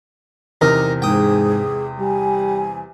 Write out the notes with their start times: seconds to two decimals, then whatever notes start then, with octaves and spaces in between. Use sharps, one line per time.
0.61 E2 C3 D#4 A#4 F6
1.02 G#2 G#4 G5 D#6
2.00 G3 G#5